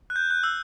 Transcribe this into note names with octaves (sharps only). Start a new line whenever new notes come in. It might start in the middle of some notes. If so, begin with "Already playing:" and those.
F#6
G6
F#6
E6